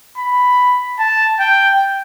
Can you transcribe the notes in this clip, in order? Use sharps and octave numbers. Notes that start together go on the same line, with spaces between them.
B5
A5
G5